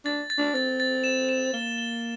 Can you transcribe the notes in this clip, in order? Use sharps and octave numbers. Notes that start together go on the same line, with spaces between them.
D4 A6
A6
D4
C4 A6
A6
E7
E7
A#3 G7
G7